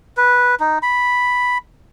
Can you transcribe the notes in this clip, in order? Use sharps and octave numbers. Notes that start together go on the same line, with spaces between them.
B4
D#4
B5